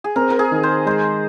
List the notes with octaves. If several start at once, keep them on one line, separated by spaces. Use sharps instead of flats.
G#4
C4 A#4
A#4
G#4
D#3
C5
G#3 C5